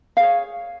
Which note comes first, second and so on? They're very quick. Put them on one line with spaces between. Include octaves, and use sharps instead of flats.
F5 G#4 C#5